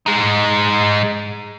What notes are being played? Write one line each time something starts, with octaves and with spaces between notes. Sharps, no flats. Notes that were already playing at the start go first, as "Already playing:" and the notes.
G#3 D#4